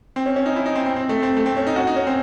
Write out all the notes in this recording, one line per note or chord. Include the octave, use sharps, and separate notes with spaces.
C4
C#4
C#4
D#4
E4
D#4
C4
C4
C4
A3
C4
A3
C4
C#4
D#4
F#4
D#4
C#4
C4